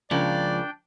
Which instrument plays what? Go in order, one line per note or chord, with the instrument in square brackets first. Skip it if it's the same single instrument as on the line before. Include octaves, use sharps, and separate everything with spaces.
[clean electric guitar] C#2 F3 [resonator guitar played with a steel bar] C#3 A#3 [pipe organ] D4 G5 [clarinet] D5